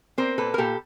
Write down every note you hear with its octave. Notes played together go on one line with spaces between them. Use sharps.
C4 A#4 C5
A#2 A4 B4
A#4
A#2 G4 A4